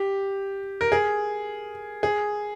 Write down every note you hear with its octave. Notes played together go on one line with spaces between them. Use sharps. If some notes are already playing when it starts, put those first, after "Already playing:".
Already playing: G4
A#4
G#4
G#4